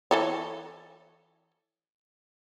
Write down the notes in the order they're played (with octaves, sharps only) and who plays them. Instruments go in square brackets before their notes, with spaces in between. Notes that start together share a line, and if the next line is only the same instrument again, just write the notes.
[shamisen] E3 A4 C#5